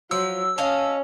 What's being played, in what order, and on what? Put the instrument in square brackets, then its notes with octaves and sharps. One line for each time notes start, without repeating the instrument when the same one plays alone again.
[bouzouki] F3 [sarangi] F#3 [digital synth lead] E6
[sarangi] C#4 [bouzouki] D#5 F5 A5